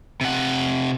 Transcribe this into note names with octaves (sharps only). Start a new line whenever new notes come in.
C3 F#5